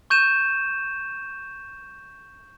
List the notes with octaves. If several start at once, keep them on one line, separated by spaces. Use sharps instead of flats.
C#6 G6 D#7 E7